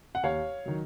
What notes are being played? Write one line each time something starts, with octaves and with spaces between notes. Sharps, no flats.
F#5
D#2 C#5 F5
D#3 F#3